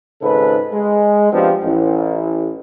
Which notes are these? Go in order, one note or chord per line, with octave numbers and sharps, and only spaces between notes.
G#1 G#2 C#3 A4 B4
G#3
F3 B3 C4 D4 F4 G4
A1